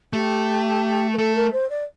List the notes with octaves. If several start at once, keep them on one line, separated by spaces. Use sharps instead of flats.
A3 G4
A#4
A3 A4
A#4
C5
D5